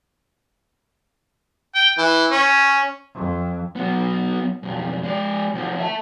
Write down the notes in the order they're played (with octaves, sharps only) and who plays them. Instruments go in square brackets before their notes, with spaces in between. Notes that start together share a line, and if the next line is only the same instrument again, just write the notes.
[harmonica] G5
E3
C#4
[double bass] F2
[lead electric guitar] F#3 B3
B1 F2
G#3 D5
D2 F3
E5 A5